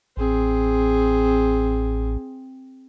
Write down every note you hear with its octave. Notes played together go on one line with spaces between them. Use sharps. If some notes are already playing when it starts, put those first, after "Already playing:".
A1 C4 G#4